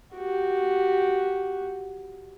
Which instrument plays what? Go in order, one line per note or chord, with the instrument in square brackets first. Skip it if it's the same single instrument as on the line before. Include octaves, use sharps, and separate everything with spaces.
[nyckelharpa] F#4 G4